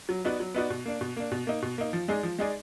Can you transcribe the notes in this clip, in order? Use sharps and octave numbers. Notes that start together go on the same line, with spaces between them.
F#3
B3 D#4 F#4 D5
F#3
B3 D#4 F#4 D5
B2
A#3 D4
B2
A#3 D4
B2
A#3 D#4
B2
A#3 D#4
F3
G#3 D#4 G#4 D5
F3
G#3 D#4 G#4 D5